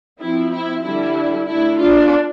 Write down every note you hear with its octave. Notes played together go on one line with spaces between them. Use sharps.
F3 C4 E4
E4
D3 G3 D4 E4
D3 A3 D4 E4
D4 F4